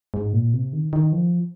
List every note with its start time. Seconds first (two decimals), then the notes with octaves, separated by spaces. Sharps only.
0.14 G#2
0.33 A#2
0.53 C3
0.73 D#3
0.93 D#3
1.13 F3